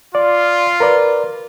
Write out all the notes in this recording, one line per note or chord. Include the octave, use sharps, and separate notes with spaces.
F4 D5
A#4 B4 D5